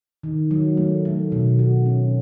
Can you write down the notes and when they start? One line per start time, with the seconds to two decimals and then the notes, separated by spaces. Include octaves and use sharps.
0.23 D#3
0.51 F#3
0.77 A3
1.05 A3
1.32 B2
1.59 F#4
1.86 C#4